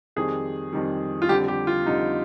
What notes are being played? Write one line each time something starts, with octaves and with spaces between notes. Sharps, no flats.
F2 D#3 G3 G#4
F2 D#3 G3
F4
F2 D3 G3 G4
G4
F4
F2 D3 G3 D#4